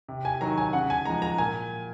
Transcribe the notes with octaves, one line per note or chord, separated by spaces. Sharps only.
C3
G#5
D#3 F#3 A#5
G#5
C#3 F#5
G#5
F3 G#3 A#5
A#5
A#2 G#5